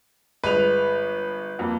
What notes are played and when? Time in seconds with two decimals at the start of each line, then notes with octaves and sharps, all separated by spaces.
0.44 G1 G#3 B4 F7
1.59 F2 A#3